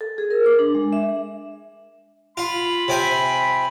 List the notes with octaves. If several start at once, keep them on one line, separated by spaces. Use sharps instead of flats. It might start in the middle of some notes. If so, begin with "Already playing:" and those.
A4
G#4
A#4
D6
D4
G#3
E5
F4 B5
C3 C4 G#5